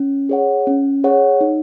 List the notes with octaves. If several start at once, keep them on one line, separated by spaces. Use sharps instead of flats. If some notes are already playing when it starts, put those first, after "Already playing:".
Already playing: C#4
G#4 C#5 F#5
C#4
G#4 C#5 F#5
D#4